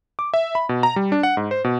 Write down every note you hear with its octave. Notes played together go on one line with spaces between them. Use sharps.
D6
E5
B5
B2
A#5
G3
D4
F#5
G#2
C5
B2